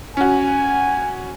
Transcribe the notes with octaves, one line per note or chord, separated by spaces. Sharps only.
C#4 F#4 G#5